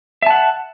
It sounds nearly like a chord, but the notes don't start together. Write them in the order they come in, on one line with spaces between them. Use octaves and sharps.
E5 A5 F#5